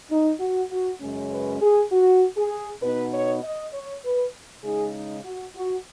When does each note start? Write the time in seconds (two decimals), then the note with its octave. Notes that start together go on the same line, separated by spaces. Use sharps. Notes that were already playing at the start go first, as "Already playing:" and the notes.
0.11 D#4
0.40 F#4
0.71 F#4
1.01 F#2 C#3 G#3 C#4
1.31 B4
1.61 G#4
1.92 F#4
2.37 G#4
2.82 B2 B3 D#4 B4
3.13 C#5
3.43 D#5
3.73 C#5
4.04 B4
4.64 C#3 G#3 D#4 G#4
4.95 D#4
5.25 F#4
5.56 F#4